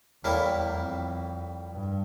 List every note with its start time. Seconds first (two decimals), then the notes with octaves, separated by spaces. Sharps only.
0.24 E2 A2 G3 A#3 E4
0.74 F2
1.73 G2